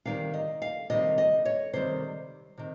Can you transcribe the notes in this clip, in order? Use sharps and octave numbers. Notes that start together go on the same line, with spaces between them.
C3 D#3 G3 F5
D#5
F5
C3 D#3 G3 D#5
D#5
C#5
C3 D#3 G3 C5
C3 D#3